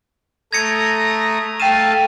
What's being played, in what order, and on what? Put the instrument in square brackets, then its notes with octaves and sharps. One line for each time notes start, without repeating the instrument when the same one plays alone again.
[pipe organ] A3 A#5 D#6 [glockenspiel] G#6 A#6 C#7
[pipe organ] A3 F5 A5 [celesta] G5 E7 [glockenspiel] D#7